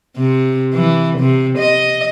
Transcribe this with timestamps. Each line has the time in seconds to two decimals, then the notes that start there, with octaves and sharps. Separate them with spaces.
0.17 C3
0.74 E3
1.19 C3
1.58 D#5